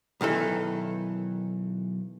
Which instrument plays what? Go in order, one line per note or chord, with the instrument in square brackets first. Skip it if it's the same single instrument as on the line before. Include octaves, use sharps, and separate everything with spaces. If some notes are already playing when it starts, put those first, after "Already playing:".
[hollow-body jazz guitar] B1 D#3 E3 A4